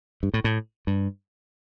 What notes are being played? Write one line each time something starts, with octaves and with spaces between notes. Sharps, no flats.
G2
A2
A2
G2